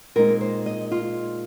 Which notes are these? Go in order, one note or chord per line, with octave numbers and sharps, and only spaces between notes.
A#2 G#3 C4 D#4 A#4
C5
D#5
F4